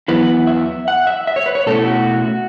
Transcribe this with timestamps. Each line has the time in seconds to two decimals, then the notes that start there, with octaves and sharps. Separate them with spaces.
0.08 E2 C#3 F#3 B3 E4 B4
0.47 E5
0.88 F#5
1.07 E5
1.27 E5
1.36 C#5
1.46 B4
1.55 C#5
1.66 B2 A3 C#4 E4 A4
1.86 F#4